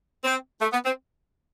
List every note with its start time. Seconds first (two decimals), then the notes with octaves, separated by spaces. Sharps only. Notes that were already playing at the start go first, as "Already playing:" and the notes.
0.24 C4
0.61 A3
0.73 B3
0.85 C4